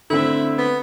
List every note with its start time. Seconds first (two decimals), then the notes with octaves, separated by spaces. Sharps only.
0.10 D3 A3 C4 E4
0.58 B3